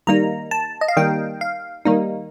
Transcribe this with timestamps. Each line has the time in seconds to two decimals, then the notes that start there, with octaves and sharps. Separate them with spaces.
0.07 D#3 G3 A#3 D#4 A#5
0.51 A5
0.81 D#5
0.88 F5
0.97 D#3 G3 A#3 D#4 G5
1.41 F5
1.85 D#3 G3 A#3 D#4